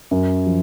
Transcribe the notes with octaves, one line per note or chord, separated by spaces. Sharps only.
F#2
F3